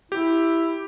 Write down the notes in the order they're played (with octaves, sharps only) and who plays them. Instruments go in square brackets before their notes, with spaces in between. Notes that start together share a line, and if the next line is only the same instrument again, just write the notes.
[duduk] E4 [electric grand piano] G4